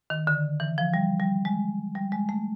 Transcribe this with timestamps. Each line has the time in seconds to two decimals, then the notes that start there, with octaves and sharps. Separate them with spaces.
0.10 D#3
0.27 D3
0.60 E3
0.78 F3
0.94 G3
1.20 G3
1.45 G#3
1.95 G3
2.12 G#3
2.29 A3